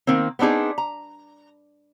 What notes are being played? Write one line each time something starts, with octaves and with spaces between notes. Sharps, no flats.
D#3 A#3 C4
B3 C4 D4 D#4 G#4
A#5